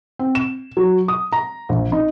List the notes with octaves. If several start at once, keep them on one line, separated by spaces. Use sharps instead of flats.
C4
E7
F#3
D#6
A#5
A#1
D#4